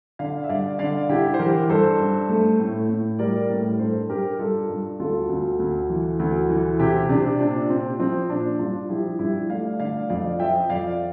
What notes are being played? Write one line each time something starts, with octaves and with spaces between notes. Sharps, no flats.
D3 D5 F5
E5
G2 D5 F5
D3 D5 F5
D3 E4 G4
C5
E3 G4 A#4
G2 A4 C5
G2
A3
A2
A2
G3 A#4 D5
A2
G2 A4 C5
G2 G4 A#4
G2 F4 A4
G2
D2 F4 A4
D2
D2
E3
D2
E3
C3 E4 G4
C3 D4
A#2 D4
A#2 C4
F3 C4
A#2 D4
G2 D4 F4
F3 E4 G4
G2 E4 G4
A3 D5 F5
D3 D5 F5
F2 D5 F5
F3 E5 G5
F2 D5 F5